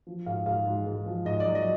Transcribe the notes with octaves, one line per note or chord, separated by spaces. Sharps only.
F3
G#2 F5
G#2 F5
G#2
G#2
F3
G#2 D#5
D5
F#3
D#5